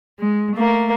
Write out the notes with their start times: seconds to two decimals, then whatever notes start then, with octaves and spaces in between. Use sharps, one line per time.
0.19 G#3
0.55 A3 A#3